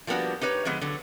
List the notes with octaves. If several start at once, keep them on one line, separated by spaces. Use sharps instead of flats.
F3 G3 A#3 B3 D4 F#4
D#4 G4 B4 C#5
D3 F3 G#3 B3
D3 F#3